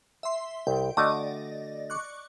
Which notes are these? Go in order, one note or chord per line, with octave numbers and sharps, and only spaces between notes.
E5 C6
C2 G5
D3 A3 F#4 D5 D#5
C#6 D6 F#6